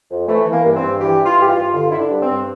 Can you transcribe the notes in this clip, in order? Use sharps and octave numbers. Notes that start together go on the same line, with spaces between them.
F2
E3 A3
E3
A#3
G2
C4
G2
E3 G4
E3
F4
G2 G4
F4
G2
D3 F4
D3 E4
D4
G2
C4
G2